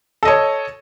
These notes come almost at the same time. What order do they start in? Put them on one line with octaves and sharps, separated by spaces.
A4 D#5 C#5